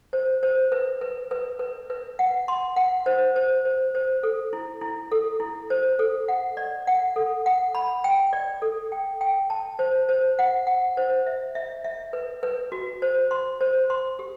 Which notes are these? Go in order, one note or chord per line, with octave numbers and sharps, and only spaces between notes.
C5
C5
B4
B4
B4
B4
B4
F#5
C6
F#5
C5
C5
C5
C5
A4
E4
E4
A4
E4
C5
A4
F#5
D5
F#5
A4
F#5
B5
G5
D5
A4
G5
G5
A5
C5
C5
F#5
F#5
C5
E5
E5
E5
B4
B4
F#4
C5
C6
C5
C6
G4